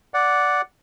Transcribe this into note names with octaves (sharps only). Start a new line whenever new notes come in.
D5 F#5